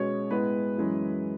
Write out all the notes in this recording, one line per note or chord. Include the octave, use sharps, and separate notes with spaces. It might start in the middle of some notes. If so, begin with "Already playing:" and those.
Already playing: B2 G#3 C#4 C#5
A2 G#3 B3 B4
F#2 E3 G#3 C#4